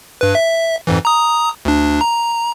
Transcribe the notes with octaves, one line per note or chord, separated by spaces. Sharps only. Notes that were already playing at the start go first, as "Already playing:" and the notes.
G2 B4
E5
F2 G#2 E3
A#5 D#6
D2 D4
A#5